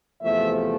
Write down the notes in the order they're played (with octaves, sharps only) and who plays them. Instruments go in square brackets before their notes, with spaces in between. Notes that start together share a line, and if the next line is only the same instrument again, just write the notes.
[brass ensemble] E2 C3 F3 A3 E5